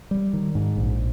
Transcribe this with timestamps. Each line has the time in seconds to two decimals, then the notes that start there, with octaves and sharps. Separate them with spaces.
0.11 G3
0.33 D#3
0.55 G#2
0.77 A#1